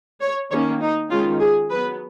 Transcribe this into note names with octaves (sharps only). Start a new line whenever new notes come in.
C#5
D#3 A#3 C#4 C#5
D#4
D#3 G#3 C#4 F4
G#4
F#3 B3 B4